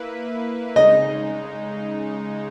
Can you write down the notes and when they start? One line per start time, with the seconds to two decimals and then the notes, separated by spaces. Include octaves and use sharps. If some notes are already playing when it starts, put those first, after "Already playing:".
Already playing: A#3 E4 B4
0.76 C#3 G#3 D#4 D#5